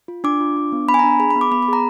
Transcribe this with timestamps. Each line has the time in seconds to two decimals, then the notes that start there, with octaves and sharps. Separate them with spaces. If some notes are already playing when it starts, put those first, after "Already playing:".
0.08 F4
0.24 D4 D6
0.40 F4
0.56 D4
0.72 B3
0.88 B3 B5
0.94 G#5
0.99 D4 A#5
1.20 G#4 B5
1.31 B5
1.36 B3
1.41 D6
1.52 B3 B5
1.62 B5
1.68 G#4 A#5